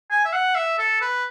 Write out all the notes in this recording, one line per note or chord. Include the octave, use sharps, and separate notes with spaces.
G#5
E5
F#5
E5
A4
B4